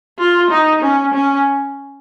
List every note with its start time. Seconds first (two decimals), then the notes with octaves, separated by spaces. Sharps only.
0.19 F4
0.51 D#4
0.82 C#4
1.13 C#4